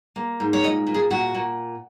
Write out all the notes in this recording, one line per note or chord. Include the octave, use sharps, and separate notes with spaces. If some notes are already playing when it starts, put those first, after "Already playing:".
A#3
G#2
C#5
A#2 D#5
A#2
G#4
A#2 F#4
A#2